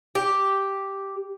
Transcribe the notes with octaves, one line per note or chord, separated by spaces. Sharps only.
G4